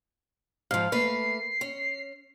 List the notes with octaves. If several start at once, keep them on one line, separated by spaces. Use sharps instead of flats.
G#2 F3 F5
A3 A#3 B4 C7
C#4